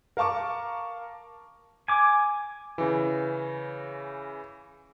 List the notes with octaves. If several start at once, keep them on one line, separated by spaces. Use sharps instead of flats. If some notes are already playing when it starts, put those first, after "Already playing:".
A#4 F5 A5 C#6 D6
G#5 D6
C#3 E3